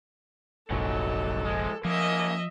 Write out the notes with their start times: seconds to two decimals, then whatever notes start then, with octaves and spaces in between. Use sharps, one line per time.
0.71 F1 A#1 G#2 F#3 A4
1.45 F3 G#3
1.85 F3 A#3 C#4 D#5 E5